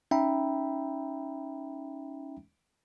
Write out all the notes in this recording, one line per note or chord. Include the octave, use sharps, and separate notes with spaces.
C#4 D#4 E5 G5 A#5 B5